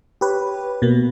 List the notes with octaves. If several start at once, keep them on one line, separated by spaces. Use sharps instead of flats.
G4 B4 C#5
B2 A#3